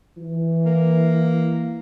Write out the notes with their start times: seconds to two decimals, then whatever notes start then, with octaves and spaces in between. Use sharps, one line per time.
0.17 E3
0.65 A#3